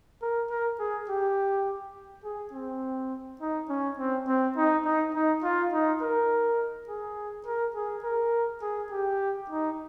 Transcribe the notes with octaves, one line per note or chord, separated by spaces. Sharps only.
A#4
A#4
G#4
G4
G#4
C4
D#4
C#4
C4
C4
D#4
D#4
D#4
F4
D#4
A#4
G#4
A#4
G#4
A#4
G#4
G4
D#4